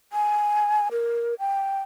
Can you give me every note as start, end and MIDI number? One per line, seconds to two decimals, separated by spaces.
0.13 0.88 80
0.92 1.34 70
1.39 1.81 79